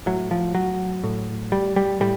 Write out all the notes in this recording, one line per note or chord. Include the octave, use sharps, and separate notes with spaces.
A2 F#3
F3
F#3
A2
G3
G3
A2 G3